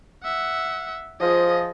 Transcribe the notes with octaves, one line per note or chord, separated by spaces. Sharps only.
E5 F#5
F3 G#4 D#5